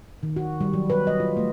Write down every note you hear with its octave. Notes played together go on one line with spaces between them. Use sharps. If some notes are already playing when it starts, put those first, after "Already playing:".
D#3
F#4
G3
F#3
B4
D#5
F4
A3